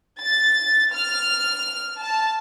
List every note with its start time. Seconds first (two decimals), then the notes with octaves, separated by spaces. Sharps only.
0.21 A6
0.95 F6
2.01 A5